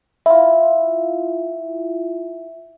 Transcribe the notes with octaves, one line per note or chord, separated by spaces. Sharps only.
E4 F4 E5